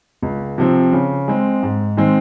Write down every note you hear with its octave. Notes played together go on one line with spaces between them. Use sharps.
C#2
C3 F3 C4
C#3
G#3 C4
G#2
D#3 G#3 C4